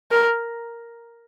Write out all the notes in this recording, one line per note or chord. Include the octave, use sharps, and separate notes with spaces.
A#4